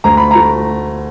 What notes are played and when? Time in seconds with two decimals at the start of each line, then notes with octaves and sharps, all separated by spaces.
0.04 D2 A#5
0.17 B5
0.31 A3 A#5